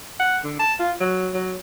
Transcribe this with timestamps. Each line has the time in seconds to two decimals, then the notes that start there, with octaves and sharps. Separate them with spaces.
0.20 F#5
0.44 D3
0.59 A5
0.79 F4
1.00 F#3
1.34 F#3